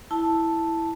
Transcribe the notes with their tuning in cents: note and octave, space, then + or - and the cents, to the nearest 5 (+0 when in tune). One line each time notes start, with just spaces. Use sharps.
E4 +0 A5 +0